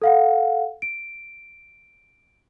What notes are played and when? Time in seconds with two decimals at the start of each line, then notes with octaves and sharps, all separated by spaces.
0.02 A4 F5 F#5
0.82 D7